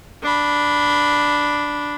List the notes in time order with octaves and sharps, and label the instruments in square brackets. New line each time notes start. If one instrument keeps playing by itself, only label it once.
[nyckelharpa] D4 B5